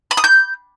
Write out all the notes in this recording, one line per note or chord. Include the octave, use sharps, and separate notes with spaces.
B5
D#6
G6